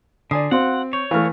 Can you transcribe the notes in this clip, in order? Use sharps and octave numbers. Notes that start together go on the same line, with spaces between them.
D3 D5 G#5 D#6 C7
C4 F#4 F5 F#5 C6
C#5 C#6 G6
E3 A3 F5 F6